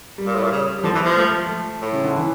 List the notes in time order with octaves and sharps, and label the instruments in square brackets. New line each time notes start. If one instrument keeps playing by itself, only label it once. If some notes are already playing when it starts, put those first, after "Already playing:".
[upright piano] G3
[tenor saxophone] A#2
A2
A#2
C#3
[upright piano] G3
[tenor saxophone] D3 [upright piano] F3
[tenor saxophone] E3
F3
[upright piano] A3
[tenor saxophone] A2
[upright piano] C#3
D3
E3